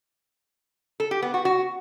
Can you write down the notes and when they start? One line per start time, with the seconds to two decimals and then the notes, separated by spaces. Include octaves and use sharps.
1.00 A4
1.11 G4
1.22 B3
1.34 F#4
1.45 F#4